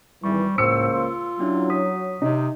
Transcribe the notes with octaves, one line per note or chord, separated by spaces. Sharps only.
G#1 E3 G3 C#6
C#2 A2 A#3 C5 E6 C#7
F4
F#3 C#4 D4 E4
C#5 D#6 B6
C3 D#4